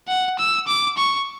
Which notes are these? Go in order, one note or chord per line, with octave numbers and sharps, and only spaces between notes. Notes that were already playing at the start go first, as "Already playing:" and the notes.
F#5
E6
D6
C#6